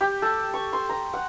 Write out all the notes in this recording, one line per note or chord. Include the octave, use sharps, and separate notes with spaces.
G4
A4
C#6
C6
A#5
F#5